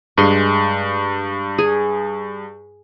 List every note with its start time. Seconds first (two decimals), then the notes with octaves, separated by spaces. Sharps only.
0.18 G2 G#3 C6 C#6
1.58 G#4